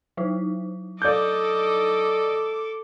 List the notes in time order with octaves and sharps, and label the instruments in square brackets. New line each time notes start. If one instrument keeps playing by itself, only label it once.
[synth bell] F#3 D#4 E4
[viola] A4 D6 [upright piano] D5 G6 [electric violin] D#5